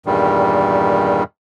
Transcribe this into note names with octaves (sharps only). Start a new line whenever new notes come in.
E2 G2 A#2 D#3 G3